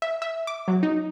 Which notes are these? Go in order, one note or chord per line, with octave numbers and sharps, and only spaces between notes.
E5
E5
D6
F#3
D#4